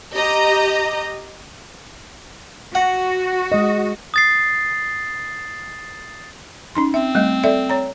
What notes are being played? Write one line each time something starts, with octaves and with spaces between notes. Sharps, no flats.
G4 D#5 A#5
F#4 F#5
G#3 D#5
D#6 A6 C7
C#4 D#4 C6
C4 E5
G3 A3 D#5
A4 D5 E5
C#5 A#5